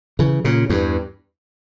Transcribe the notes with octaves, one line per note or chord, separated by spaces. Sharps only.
C#3 E3
A#2 C#3
E2 G2